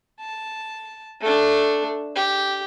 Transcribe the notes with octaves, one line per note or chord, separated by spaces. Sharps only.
A5
A3 D4
G4